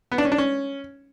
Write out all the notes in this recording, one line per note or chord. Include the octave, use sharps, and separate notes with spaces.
B3
D4
C#4
D4
C#4